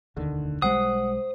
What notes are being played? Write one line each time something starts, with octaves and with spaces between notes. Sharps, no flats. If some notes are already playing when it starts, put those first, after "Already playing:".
E1 D2 D3 D#3
B1 G3 G#3 C5 F#5 D#6